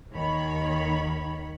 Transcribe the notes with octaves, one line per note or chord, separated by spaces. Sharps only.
D#2 D#3 C#5 B5